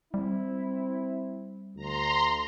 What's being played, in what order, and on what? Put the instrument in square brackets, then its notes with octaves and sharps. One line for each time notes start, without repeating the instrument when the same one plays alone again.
[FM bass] G3 [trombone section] C4 E4
[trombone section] D2 [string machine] A#5 C6